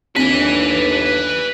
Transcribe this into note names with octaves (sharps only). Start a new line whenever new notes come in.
G1 D#2 C4 D4 B4 G#5 B6